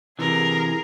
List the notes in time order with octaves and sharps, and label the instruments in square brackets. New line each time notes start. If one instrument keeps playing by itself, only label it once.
[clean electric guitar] C3 E3 [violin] G#4 A#4